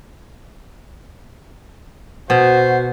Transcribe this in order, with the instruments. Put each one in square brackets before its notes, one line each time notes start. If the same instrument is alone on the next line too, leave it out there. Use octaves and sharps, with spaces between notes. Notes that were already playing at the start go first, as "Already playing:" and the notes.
[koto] B2 [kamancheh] F#4 [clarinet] C5